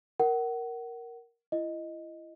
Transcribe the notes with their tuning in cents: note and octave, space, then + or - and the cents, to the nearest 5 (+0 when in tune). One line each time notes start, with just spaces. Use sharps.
A#4 +0 F#5 +30
E4 +35 D#5 +0